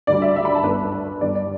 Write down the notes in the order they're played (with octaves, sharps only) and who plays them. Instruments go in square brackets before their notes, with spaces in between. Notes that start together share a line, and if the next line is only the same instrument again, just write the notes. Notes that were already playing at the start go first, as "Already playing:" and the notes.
[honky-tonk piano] D2 D3 G3 D5
E5
E5
B5
A5
G1 G2 D3 B4
G1 G2 G3 D5
D5